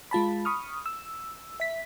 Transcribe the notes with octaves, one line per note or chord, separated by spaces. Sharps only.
G#3 F4 A5 B5
B5 C#6 D#6 F6
E6
E5 B6